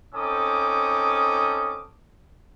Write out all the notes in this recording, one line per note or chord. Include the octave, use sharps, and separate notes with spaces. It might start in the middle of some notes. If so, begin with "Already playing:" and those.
C4 C#4 D#4 A4 D6 D#6